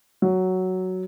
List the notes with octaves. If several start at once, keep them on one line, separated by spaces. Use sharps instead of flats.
F#3